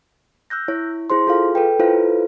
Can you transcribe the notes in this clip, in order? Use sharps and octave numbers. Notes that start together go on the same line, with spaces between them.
E6 F#6 G6 A#6
E4 C#5
E4 G#4 C5 C6
F4 G#4 A4 F5
A4 B4 G5
E4 F4 A4 B4 C5 F5